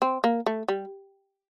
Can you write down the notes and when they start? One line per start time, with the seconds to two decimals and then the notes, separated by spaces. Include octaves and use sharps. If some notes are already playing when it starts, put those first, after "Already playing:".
0.02 C4
0.24 A#3
0.46 A3
0.68 G3